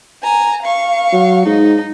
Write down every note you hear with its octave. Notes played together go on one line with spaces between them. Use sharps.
G#5 A#5
F5 C#6
F#3
G#2 D#4